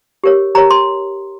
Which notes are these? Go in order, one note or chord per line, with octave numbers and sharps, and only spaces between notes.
G4 A#4 C#5
G4 A#4 C#5 A#5
C6